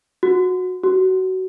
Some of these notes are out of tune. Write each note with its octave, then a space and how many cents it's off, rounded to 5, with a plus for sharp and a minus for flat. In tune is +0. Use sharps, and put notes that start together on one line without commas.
F#4 -15
F#4 +20